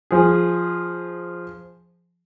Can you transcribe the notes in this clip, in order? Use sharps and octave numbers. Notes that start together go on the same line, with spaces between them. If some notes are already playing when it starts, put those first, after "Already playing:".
F3 G#4